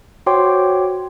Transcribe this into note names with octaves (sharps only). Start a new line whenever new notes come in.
F#4 C5 C#5 G5 C6 D6